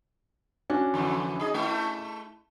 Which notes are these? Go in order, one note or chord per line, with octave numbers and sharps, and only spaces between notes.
C#4 D4 F#4
F2 D3 E3
D#4 G#4 D#5
A3 E4